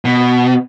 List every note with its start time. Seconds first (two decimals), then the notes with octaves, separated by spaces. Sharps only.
0.05 B2